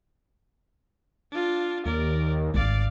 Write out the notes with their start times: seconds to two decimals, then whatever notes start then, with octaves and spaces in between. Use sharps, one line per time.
1.32 D4 F4
1.85 D#2 A#4 D5
2.54 G#1 D2 D5 F5